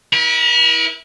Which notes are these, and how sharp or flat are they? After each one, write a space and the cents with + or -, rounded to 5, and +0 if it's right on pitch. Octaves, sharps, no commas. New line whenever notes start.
E4 -25 A#4 +40